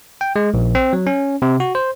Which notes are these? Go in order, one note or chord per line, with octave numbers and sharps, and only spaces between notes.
G5
G#3
A#1
C4
F#3
C#4
C3
F#4
C5